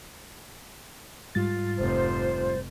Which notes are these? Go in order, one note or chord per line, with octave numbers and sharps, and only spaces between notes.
G#2 G3 F4 A6
F1 C5